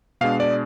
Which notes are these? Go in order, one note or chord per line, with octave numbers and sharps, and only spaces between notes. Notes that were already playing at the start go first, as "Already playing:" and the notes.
B2 G#3 D4 F5
D5